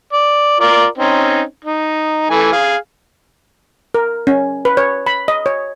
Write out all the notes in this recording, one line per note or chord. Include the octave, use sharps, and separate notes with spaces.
D5
F4 A#4 D5
C4 C#4 D#4
D#4
E3 A3 G#5
G#4 F5
A#4
C#4
B4
C#5
B5
D#5
C#5